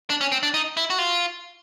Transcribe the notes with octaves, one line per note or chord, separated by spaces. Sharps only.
D4
C#4
C4
D4
D#4
E4
F#4
F4